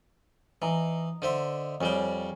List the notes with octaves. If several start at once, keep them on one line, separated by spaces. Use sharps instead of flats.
E3 D#5 A#5
D3 C5 E5
F2 G3 G#4 C#5 G5